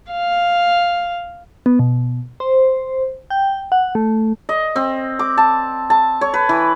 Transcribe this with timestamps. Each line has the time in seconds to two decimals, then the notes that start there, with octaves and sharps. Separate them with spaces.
0.11 F5
1.66 B3
1.79 B2
2.40 C5
3.30 G5
3.72 F#5
3.95 A3
4.49 D#5
4.76 C4
5.19 D6
5.38 A5
5.90 A5
6.21 C#5
6.34 B4
6.49 E3